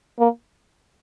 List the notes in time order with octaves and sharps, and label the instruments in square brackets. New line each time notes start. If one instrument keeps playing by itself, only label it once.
[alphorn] A#3